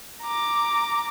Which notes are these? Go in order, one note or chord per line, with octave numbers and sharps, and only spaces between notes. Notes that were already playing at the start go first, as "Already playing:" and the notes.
A#5 D6